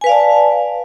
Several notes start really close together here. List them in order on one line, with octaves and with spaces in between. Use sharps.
G#5 B4 F5 D5 A5